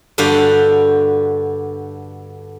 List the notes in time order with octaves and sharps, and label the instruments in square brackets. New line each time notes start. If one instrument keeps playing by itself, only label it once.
[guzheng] G2 D3 F#4 G4 F5